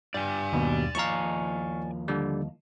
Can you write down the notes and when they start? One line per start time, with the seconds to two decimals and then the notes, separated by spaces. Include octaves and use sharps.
0.14 G2 G3 D5 G#5
0.53 D#2 B2
0.95 D#2 F3 F5 A#5 C#6
2.08 D3 G3